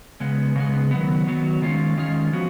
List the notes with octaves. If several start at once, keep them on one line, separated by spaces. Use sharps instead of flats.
C#3 G#3 B3
C#3 G#3 B3
D#3 F#3 B3
D#3 F#3 B3
D#3 G#3 C#4 F4
D#3 G#3 C#4 F4
F3 B3 F#4